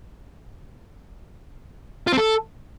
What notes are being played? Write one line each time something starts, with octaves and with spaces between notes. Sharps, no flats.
F4
C4
A4